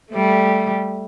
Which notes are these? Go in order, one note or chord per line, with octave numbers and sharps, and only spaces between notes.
G3 A3